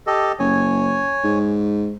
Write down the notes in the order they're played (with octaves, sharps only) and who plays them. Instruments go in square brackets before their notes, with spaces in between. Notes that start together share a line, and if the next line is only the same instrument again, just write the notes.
[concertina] G4 A4 D#5
[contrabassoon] F#1 [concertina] C#5 G#5
[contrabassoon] G#2